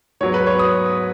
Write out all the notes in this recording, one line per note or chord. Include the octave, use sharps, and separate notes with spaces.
G#2 F#3 B3 C#5
B4
C#5
D#6